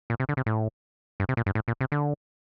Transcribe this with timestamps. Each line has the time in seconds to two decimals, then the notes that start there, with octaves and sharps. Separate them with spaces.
0.10 A#2
0.20 C3
0.29 D3
0.37 C3
0.46 A2
1.20 G2
1.29 C3
1.37 A#2
1.46 G2
1.55 A2
1.68 A#2
1.81 C3
1.92 D3